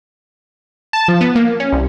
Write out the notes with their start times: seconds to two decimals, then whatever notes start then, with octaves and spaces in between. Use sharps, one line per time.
0.93 A5
1.08 F3
1.21 B3
1.35 A#3
1.60 C#4
1.72 C2